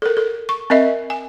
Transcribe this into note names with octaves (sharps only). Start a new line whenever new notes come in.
A4 A#4
A4
C#6
C4 A#4 D#5 E5
G#5